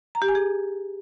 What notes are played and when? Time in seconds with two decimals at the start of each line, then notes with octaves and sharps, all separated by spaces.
0.15 A#5
0.22 G4
0.28 G#5
0.35 G#4